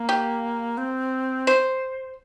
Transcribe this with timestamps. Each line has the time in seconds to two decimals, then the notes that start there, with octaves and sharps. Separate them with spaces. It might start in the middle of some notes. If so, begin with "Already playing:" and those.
Already playing: A#3
0.09 G4
0.78 C4
1.47 C5